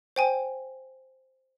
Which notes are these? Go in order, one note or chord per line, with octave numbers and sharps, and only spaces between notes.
C5 G5 G#5